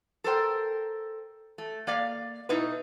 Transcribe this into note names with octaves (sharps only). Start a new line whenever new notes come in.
A4 A#4 C5 G5
A3
A#3 D5 F5
B2 D#4 E4 B4